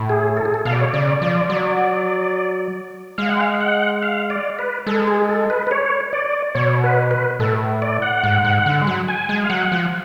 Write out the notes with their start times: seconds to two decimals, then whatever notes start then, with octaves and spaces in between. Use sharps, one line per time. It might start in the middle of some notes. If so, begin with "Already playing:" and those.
Already playing: A2
0.10 G#4
0.37 A4
0.45 G#4
0.54 A4
0.65 B2 F5
0.73 D5
0.81 C#5
0.89 D5
0.94 C#3
1.22 F3
1.50 F#3
3.18 G#3 F5
3.29 F#5
3.41 F5
3.61 F#5
4.03 F5
4.30 D5
4.59 B4
4.87 G#3 A4
5.07 G#4
5.29 A4
5.50 B4
5.67 B4
5.71 C#5
6.13 D5
6.55 B2 C#5
6.84 B4
7.11 B4
7.40 A2 A4
7.82 D5
8.02 F#5
8.24 G#2
8.44 G#2
8.66 D3
8.82 G#3
8.87 F#3
9.08 G#5
9.29 G#3
9.44 F5
9.50 F#3 F#5
9.72 F3